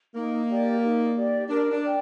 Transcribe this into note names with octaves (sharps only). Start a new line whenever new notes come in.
A#3 D#4
G4 D5
D#4
G4 D5
D4 A#4
D4
D5 G5